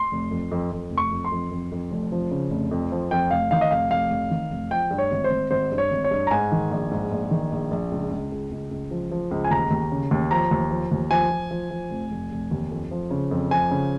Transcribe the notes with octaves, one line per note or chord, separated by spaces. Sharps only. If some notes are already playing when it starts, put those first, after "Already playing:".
Already playing: C6
F1
F2
F2
F2
F1
C#6
F2
C6
F2
F2
F2
F1
F3
C#3
F1
F2
F3
F2 G5
F1 F5
D#3 F5
D#5
F1 F5
F1 F5
F1
D#3
F1
F3 G5
G2
C#5
G#1
C5
G#1
G#1 C5
G2
C#5
G#1
C#5
G2
A#5
G#2 G#5
D#3
A#1
G#2
A#1
D#3
A#1
A#1
C#2
C#2
C#2
C#2
C#2
F3
F3
C#2
G#5
D#2 A#5
D#2
C#3
D#2
F3 A#5
D#2
F3
D#2
F3 G#5
F3
F3
F3
F1
F1
F1
D#2
F2
F3
C#3
F2
F3 G#5
C#3